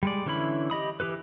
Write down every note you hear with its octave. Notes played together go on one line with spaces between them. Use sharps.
G3 G#3 D5
D3 E3 C#4 E4 B5
G4 D#5 B5 D#6
E3 G4 A4 B4